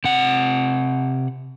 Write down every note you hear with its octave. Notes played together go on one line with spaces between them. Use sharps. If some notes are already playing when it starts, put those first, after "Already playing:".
C3 F#5